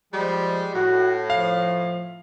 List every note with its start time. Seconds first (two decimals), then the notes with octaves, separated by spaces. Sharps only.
0.13 F3 G3 G#3
0.74 A2 F#4
1.30 F3 F5